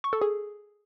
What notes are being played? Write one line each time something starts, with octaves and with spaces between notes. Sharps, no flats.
C#6
A4
G#4